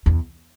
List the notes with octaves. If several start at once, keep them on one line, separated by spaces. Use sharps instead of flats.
E2